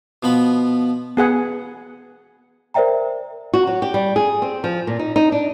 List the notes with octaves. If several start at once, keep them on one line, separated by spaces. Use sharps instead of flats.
B2 F3 B3 B5
B3 G#4 F#5
A#4 C5 D5 E5 G5 A#5
F#4
F#3
G4
G3
G#4
C4
F3
A#2
D#4
D#4
D4